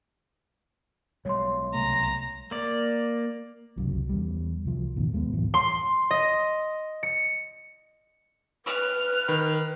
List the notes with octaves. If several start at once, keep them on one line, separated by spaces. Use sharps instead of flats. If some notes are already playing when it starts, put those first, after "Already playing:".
B1 G3 G#3 C#5 C6
C2 A3 A#5
A#3 D5
F#1 C2 C#3 F#3
E2 G3
C2 F3
E1 A1 B2 D#3
D#1 G#3 B3
D1 A1 F#2 E3
C6
D#5
C#7
B4 F6
D#3 B5